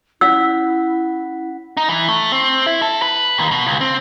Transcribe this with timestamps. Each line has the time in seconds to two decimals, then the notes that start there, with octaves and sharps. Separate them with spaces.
0.21 C#4 E4 F#5 E6 B6
1.77 D#4
1.89 E3
2.08 A3
2.32 C4
2.66 E4
2.82 A4
3.02 B4
3.38 D#2
3.51 B2
3.66 C#2
3.81 C4